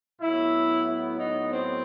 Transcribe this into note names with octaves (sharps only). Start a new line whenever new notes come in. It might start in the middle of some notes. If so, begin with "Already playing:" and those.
A2 F#3 B3 E4
E4
D#4
C4